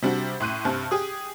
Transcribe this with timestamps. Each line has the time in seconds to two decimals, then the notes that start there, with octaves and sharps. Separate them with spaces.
0.02 C3 G3 D4 F#4
0.40 A2 C6 F#6 D#7
0.65 G2 C3 A5
0.91 G4 G#4 D#6